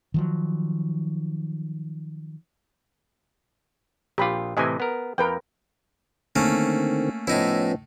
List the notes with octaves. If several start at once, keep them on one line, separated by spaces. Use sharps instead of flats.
D#3 F3 F#3
A#1 F4 G4 B5
A2 C3 E3 D#5 G#5
B3 A#4
F2 A#4 B4 G5
D3 D#3 A3 A#3 C4 C#4
A2 F3 B3 C#4 D#4 E4